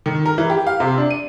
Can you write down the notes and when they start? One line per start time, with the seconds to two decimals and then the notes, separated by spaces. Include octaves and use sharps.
0.06 D#3
0.26 A#4
0.38 E3
0.50 G4
0.67 F5
0.80 C3
0.98 D4
1.10 D#7